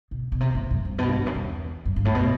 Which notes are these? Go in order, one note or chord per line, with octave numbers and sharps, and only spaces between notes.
B2
B2
C3
A2
F#2
G2
B2
G2
E2
F#2
E2
F#2
G2
A2
B2